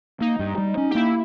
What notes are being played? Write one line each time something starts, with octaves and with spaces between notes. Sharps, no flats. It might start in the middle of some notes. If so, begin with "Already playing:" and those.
A#3 D#4
G2
G3
C#4
G4
A#3 E4